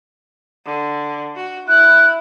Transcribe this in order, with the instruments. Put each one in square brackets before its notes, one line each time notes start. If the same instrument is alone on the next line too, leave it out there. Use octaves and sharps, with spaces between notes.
[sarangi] D3
F#4
[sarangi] E4 [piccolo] F#6